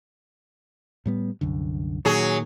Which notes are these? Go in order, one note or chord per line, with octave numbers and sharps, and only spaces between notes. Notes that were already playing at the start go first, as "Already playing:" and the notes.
A2 G3 B3
C2 F#2 D3
A#2 D#3 F#3 G#4